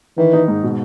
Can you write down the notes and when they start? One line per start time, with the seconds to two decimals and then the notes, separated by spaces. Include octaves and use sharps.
0.18 D#3 E3
0.33 D#4
0.48 G#2
0.63 B2